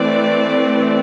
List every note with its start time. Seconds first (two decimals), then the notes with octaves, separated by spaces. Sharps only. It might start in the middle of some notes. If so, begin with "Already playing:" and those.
Already playing: E3 A3 C4 D5